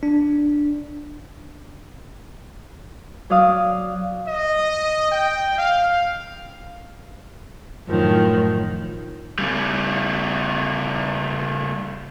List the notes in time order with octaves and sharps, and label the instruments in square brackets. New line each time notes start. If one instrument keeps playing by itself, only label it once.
[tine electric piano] D4
[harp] F#3 D5 F5 D#6
[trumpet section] D#5
G5
F5
[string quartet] F#2 A2 D#3 F3
[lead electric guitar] C#3 G3